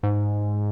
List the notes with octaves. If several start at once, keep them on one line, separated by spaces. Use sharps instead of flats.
G#2